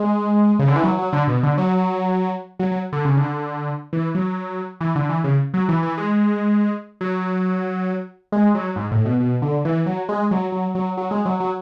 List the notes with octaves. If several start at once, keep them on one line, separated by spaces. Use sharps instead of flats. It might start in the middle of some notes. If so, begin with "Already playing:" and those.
Already playing: G#3
C#3
D3
E3
F#3
F#3
D3
B2
D3
F#3
F#3
F#3
D3
C#3
D3
E3
F#3
E3
D3
E3
C#3
F#3
E3
E3
G#3
F#3
G#3
F#3
G#2
A2
B2
B2
D3
E3
F#3
G#3
F#3
F#3
F#3
F#3
G#3
F#3
F#3